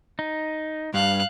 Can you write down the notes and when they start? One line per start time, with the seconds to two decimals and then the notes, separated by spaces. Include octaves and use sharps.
0.19 D#4
0.94 G2 F5 F#6